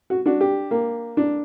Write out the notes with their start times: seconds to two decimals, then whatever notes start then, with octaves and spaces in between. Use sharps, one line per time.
0.10 F#4
0.26 D4 F#4
0.41 G4
0.71 A#3
1.17 D4